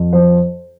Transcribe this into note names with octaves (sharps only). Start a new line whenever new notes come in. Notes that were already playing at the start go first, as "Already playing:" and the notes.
Already playing: F2
F3 C5